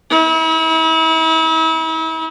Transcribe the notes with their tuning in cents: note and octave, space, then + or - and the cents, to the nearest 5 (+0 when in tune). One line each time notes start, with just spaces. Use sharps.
E4 -40